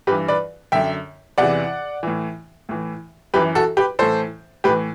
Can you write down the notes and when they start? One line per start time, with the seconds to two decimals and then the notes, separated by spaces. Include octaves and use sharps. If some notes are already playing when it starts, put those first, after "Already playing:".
0.07 G2 E3 G4 B4
0.28 B4 D5
0.72 F#2 D3 E5 G5
1.38 E2 C3 E3 D5 F#5
2.03 A2 E3
2.69 A2 E3
3.34 F#2 E3 G4 B4
3.55 F#4 A4
3.77 G4 B4
3.99 A2 E3 A4 C5
4.64 A2 G4 B4
4.68 E3